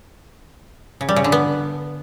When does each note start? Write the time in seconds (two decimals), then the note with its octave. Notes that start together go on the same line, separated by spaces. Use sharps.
1.01 C#3
1.09 G3
1.16 C#3
1.24 D3
1.32 B3